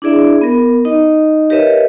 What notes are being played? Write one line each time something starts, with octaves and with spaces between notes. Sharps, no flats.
D4 E4 G#4 D5 E5
B3 A#4
D#4 D#5
G4 A#4 B4 C#5 D#5 E5